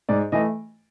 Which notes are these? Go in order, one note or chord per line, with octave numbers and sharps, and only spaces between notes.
G#2 D5
E3 A3 D#5